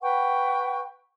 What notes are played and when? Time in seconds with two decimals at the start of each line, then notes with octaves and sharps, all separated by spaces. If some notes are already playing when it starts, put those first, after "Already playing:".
0.02 B4 F#5 G5 C#6